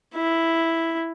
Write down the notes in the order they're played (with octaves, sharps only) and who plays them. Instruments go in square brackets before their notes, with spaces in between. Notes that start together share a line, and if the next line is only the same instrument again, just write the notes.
[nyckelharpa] E4